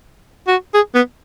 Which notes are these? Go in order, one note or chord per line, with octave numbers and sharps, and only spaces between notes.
F#4
G#4
B3